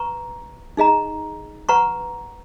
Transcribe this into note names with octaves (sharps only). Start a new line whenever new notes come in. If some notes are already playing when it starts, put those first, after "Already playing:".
Already playing: B4 A#5 C#6
D#4 G#4 D#5 A#5
B4 F#5 A#5 C#6